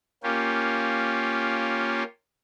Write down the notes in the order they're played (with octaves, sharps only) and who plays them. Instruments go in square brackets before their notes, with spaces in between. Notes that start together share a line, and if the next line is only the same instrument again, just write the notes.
[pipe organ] A#3 C#4 F4 G4